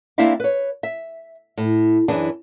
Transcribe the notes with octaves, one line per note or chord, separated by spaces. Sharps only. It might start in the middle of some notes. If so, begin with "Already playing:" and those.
A#3 C4 D4 E4 E5 F5
B4 C#5
E5
A2
F#2 E3 D4 G#4